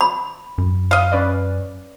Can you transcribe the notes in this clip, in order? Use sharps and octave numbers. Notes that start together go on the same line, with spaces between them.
B5
F#2
D#5 F5
C#4 B4 D5